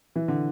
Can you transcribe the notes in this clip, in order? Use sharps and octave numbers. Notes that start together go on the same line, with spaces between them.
E3
D3